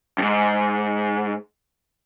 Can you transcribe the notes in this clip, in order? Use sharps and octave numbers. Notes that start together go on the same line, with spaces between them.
F2 G#2